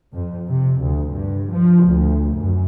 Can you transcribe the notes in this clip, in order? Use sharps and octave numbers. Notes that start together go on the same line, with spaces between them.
F2
C3
D2
G2
F3
D2
F#2